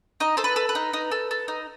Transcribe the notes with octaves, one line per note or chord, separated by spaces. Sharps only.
D#4 D#5
A4 C5
B4
A4
B4
D#4
D#4
A4
A4
D#4